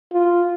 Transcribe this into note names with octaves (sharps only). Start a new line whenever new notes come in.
F4